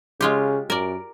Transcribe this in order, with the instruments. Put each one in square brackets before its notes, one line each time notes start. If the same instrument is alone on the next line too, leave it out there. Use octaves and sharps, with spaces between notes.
[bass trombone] C#3 [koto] G#3 F4 G4
[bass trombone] F#2 [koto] A#4 D5